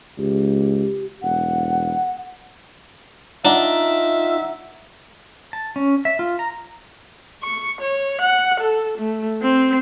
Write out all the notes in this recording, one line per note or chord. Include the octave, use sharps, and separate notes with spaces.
C#2 G4
E1 F#5
D4 D#4 F4 E5 F#5 A#5
A5
C#4
E5
F4
A#5
C#6
C#5
F#5
A4
A3
C4